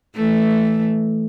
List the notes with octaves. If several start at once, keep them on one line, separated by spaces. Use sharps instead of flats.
E3 A3